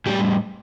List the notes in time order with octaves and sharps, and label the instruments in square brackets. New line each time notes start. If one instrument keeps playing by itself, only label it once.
[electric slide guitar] A2 E3 G3 G4